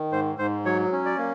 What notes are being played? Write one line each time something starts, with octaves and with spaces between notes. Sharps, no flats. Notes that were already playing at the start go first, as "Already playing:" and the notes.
Already playing: D#3
G#2 C5
G#2 C5
F#3 C#5
C#4
D5
A#3